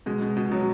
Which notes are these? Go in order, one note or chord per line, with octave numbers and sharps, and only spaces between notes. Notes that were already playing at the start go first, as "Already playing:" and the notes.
B2 G#3
B2
B2
B2 F#3